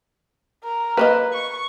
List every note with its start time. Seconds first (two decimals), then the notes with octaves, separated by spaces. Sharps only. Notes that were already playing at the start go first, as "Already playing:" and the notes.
0.64 A#4
0.97 A#3 B4 C#5 D#5
1.33 C#6